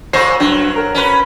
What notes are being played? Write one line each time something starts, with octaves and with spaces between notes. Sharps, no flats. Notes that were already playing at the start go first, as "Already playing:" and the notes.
A#2 C5 C#6 A#6 C7
G2 F#3
A#4
C#4 B4